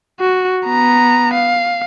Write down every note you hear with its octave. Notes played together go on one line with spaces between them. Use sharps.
F#4
B3 A#5
F5